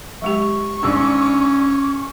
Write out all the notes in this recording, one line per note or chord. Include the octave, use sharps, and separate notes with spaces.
F#3 G#3 G4 C#6
G#1 C#4 D4 E6